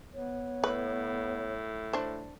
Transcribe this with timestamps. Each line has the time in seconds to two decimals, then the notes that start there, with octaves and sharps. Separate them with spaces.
0.14 B3 C#5
0.64 A2 B4
1.93 D4 C5